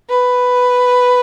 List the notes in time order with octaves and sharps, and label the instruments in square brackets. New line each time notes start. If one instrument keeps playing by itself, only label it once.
[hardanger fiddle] B4